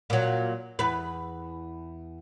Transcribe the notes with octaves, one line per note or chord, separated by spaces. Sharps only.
A#2 F#3
E2 B4